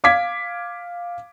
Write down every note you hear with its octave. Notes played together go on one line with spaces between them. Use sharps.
F5 D6 G#6 B6